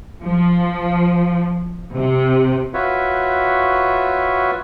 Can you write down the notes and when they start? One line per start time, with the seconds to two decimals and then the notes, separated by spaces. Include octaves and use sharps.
0.23 F3
1.96 C3
2.74 F4 F#4 B4 C#5 E5